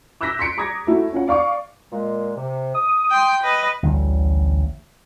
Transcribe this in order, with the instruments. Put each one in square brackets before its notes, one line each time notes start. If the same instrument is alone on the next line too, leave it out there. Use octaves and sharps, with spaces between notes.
[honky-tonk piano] D6 E6 F#6 G6 A#6 B6
C6 B6 C#7 D7
A#5 D6 D#6 G#6 A#6
A3 E4 F#4
C#4 F4 F#5
D5 F5 C#6 D6
[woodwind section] A#2 G#3
C3
D#6
[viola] G5 C6
B4 D#5
[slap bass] A1 D2 D3 G3